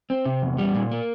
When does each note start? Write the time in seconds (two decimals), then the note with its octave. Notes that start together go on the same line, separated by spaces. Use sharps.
0.10 C4
0.25 C3
0.42 E2
0.58 G3
0.75 A#2
0.91 A#3